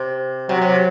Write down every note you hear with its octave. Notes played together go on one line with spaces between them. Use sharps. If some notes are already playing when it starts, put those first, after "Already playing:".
Already playing: C3
C3 F#3
C3